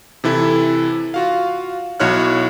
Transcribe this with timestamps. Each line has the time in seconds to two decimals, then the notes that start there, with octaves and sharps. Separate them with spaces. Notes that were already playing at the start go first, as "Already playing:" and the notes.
0.24 C3 E3 E4 A4
1.14 F4 F#4 F5
2.00 B1 E4 F#4 C#5 F6 F#6